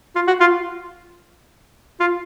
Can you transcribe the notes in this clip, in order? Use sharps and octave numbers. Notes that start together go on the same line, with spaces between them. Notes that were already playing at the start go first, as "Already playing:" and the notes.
F4
F#4
F4
F4